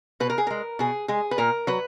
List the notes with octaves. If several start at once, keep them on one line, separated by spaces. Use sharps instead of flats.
B2 B4
A#4
G#4
G#3 A#4
B2 G#4
G#3 G#4
B4
A#2 A#4
F#3 B4